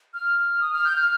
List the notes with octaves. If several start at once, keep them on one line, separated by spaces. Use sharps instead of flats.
F6
D#6
F6
G6
F6